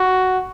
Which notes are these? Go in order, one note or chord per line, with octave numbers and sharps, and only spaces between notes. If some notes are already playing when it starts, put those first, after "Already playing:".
Already playing: F#4